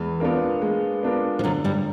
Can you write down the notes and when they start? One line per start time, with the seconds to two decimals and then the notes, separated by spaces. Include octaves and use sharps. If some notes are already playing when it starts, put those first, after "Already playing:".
Already playing: E2 E3 G#3
0.20 B3 D4 F4 A#4
0.62 G#3
1.03 B3 D4 F4 A#4
1.39 F3
1.43 F#2 D3 F#3
1.64 G2 G3